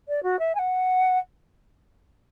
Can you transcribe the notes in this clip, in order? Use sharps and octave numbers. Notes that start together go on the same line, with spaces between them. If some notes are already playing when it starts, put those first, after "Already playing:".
D5
F#4
E5
G#5
F#5